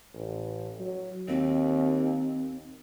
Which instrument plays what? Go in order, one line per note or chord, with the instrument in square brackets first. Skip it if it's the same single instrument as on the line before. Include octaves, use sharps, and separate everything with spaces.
[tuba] A1
F#3
[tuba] D#2 [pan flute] C4